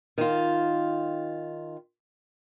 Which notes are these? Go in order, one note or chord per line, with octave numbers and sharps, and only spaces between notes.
D#3 F4